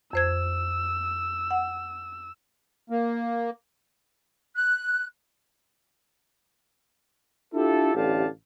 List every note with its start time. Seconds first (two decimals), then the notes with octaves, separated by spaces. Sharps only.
0.13 F2 C5 E6 G#6
1.51 F#5
2.90 A#3
4.55 F#6
7.55 D4 E4 F4 G4 A4
7.95 A1 D3 A3 G4 F5 A5